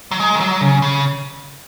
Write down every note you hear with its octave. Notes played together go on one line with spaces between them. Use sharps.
F#3
G#3
D#3
F#3
C#3
C#3